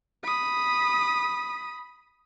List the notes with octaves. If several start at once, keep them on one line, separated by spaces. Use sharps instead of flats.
B5 D#6